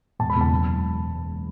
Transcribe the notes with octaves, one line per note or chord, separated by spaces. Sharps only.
E1 A5
B5
E2 C#3 E3 G#3
A5
F#1